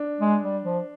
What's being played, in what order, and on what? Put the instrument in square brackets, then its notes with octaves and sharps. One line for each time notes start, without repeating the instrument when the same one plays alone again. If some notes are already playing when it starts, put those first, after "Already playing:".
Already playing: [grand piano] D4
[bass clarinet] G#3
G3
F3